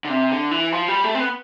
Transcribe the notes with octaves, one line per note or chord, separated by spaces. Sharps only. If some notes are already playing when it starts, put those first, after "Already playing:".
D3
C3
D3
E3
F3
G3
A3
C4
B3